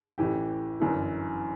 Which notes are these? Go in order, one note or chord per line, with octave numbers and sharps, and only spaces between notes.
A1 A2 E3 G4
G1 F#2 E3